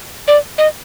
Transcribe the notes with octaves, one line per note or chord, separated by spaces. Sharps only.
D5
D#5